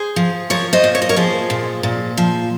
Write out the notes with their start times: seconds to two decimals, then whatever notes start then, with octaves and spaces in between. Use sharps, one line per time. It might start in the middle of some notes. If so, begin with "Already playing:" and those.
Already playing: G#4 C5
0.16 F3
0.50 F3 A#4 C#5
0.73 C5 D#5
0.84 A#2
0.95 C#5
1.02 D#5
1.09 A#4 C#5
1.16 F3 G#4 C5
1.50 A#2
1.83 A#2
2.17 F3